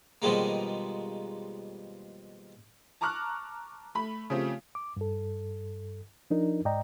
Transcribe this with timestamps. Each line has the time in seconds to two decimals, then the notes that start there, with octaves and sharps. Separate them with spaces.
0.22 B2 D#3 F3 G3 G#3 A#3
3.01 A5 A#5 C#6 D6 F6 F#6
3.95 A3 B5
4.30 C#3 F3 A3 C4 G4
4.75 D6
4.97 G2 A4
6.30 F3 D4 D#4 A#4
6.65 G#2 D5 D#5 G5 A#5